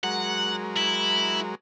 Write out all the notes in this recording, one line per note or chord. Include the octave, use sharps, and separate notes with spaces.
F#3 G#3 A#4 F#5
E4